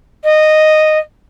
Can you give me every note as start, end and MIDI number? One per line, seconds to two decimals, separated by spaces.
0.23 0.98 75